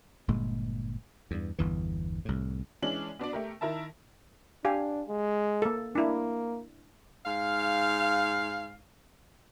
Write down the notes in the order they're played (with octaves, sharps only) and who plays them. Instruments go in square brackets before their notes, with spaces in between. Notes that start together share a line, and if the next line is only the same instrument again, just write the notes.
[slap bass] G1 A#2 G#3
E2 G2
G1 E2 E3
C2 A2
[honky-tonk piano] E3 G#3 C#4 D4 F#7
B3 D4 F#4 D5
A3 G4 A#4
D#3 E4 A#4 E5 A5
[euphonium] D4 [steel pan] G4 F5 G#5
[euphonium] G#3
[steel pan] A#3 A4
[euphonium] A#3 [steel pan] D4 E4
[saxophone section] G#2 F5